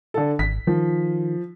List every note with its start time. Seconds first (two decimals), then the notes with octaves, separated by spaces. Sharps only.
0.14 D3 A4
0.39 G#1 B6
0.67 D#3 F3